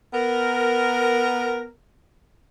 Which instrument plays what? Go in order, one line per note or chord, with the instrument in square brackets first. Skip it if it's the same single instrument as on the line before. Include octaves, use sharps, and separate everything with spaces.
[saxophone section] B3 A#4